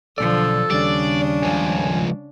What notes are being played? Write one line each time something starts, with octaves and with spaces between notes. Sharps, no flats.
B1 D3 F3 A4 D5
D#2 C#3 G3 D4 D5
C#2 F3 G#5